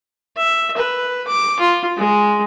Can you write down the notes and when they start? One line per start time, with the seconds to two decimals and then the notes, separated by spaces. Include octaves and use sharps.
0.36 E5
0.77 B4
1.27 D6
1.59 F4
1.97 G#3